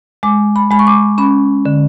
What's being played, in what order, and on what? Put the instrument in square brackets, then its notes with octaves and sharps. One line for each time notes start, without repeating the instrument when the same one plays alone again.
[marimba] G#3 D6
B5
G#3 B5
C#6
D6
C#4 B5
D3